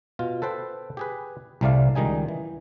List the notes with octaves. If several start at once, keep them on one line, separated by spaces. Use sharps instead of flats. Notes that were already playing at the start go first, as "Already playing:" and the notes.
B2 F4
A4 B4 C5 G5
G4 G#4 B4
C2 C3 G3 A3 D5 F5
C#2 D#3 G3 D#4 G#5
E3